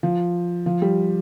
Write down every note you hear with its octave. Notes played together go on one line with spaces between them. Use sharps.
F3
F3
G3